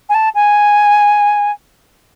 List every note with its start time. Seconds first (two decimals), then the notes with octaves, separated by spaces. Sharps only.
0.09 G#5
0.14 A5
0.35 G#5